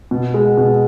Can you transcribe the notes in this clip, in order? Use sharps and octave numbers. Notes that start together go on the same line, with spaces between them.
B2
G#3
F#5
B2